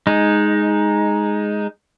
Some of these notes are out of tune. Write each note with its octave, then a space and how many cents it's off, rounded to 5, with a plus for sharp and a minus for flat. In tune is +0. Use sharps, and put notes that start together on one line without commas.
G#3 +0 D#4 +0